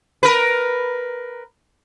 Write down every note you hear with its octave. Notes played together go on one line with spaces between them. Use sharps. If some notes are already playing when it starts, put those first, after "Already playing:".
A#4 B4